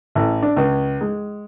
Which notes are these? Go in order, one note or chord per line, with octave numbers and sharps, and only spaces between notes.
A1
D4
C#2
G#3